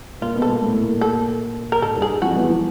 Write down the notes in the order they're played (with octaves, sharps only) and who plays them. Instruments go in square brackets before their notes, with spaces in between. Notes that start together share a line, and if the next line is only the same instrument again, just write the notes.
[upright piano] A#2 A#3 [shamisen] F4
[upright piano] B2 B3
[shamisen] A4
[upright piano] A#2 A#3
A2 A3
A#2 A#3
[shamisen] A4
A#4
[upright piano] G#2 G#3 [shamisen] A4
[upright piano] G2 G3
[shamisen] G#4
[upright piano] F2 F3 [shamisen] F#4
[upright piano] E2 E3
F3